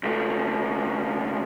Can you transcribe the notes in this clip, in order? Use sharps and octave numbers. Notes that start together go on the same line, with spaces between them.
C#2 A3